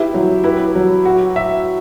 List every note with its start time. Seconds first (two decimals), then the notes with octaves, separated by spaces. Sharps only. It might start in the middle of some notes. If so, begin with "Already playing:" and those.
Already playing: E4 G4 B4
0.14 F#3
0.44 E4 G4 B4
0.75 F#3
1.05 F#4
1.36 E5